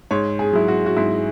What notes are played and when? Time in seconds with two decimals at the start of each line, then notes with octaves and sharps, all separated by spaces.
0.11 G#2 C#5
0.39 G#4
0.53 F#3 E4
0.68 F#4
0.86 F#4
0.97 G#2 E4